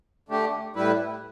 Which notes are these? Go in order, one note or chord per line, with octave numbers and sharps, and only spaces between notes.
D3 A3 G4
A2 G3 E4 B4